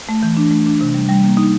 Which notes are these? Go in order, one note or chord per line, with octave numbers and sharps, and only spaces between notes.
A3
E3
D4
A3
D4
C3
G3
G3
A#3
D#4